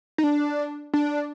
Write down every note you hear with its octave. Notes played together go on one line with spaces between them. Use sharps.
D#4
D4
D4